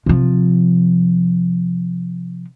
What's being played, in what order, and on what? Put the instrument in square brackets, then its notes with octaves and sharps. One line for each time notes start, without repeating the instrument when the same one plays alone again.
[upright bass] C3 F3